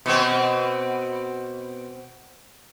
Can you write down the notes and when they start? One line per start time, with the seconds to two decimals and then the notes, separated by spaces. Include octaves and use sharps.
0.06 B2 C4